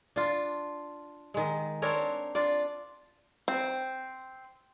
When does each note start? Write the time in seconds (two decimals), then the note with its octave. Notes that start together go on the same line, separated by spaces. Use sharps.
0.16 D4 F4
1.34 D#3 G#3
1.82 C4 D4 A#4 C#5
2.35 D4 F4 D5
3.48 C4